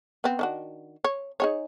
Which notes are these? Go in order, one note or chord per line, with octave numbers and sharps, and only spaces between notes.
B3 C4
D#3 D4 F#4
C#5
D#4 G#4 C#5